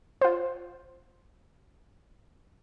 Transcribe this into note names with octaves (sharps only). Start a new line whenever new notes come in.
F4 C5